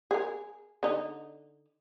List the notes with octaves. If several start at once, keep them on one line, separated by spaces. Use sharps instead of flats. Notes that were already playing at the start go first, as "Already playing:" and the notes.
G#4 A#4
D3 D#4